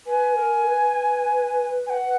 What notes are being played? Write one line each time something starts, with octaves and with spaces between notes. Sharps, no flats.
B4 G#5
A#4
B4
G#5
F#5